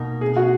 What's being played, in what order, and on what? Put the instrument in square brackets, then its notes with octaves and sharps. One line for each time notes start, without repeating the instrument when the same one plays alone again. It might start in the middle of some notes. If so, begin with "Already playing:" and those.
Already playing: [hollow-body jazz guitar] B2 A#3 D#4 A#4
[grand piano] G#4
F#4